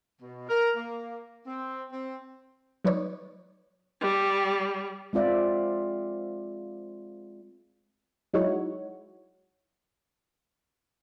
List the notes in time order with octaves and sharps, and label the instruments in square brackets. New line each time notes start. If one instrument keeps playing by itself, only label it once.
[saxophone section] B2
A#4
A#3
C4
C4
[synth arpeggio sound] F#3 D#4 B4 C#5 D5
[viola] G3
[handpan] G#3 C4 F4 D5 E5
[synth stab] F#3 G#3 D#4 E4 F#4 C#5